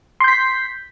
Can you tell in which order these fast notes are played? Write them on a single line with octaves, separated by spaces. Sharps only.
C6 G6 B6